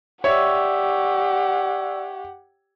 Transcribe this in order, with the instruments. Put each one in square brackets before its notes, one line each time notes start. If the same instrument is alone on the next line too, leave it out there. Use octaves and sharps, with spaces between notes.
[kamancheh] G4 F#5 [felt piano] C#5 E5 [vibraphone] D5 C#6 E6